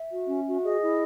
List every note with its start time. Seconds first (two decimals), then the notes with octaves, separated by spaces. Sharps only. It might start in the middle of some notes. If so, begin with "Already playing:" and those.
Already playing: E5
0.11 F#4
0.28 C#4
0.47 F#4
0.63 G#4 D#5
0.82 E4